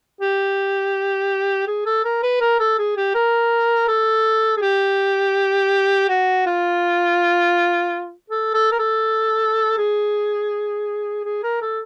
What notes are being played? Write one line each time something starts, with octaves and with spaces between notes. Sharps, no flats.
G4
G#4
A4
A#4
B4
A#4
A4
G#4
G4
A#4
A4
G#4
G4
F#4
F4
A4
A4
A#4
A4
G#4
G#4
A#4
A4